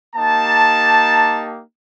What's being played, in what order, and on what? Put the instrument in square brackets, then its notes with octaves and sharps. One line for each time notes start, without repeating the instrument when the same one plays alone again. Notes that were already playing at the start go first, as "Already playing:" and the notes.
[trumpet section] A#3 D#4 G4 A5